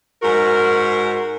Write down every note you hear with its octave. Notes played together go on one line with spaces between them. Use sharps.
G#2 F#4 A#4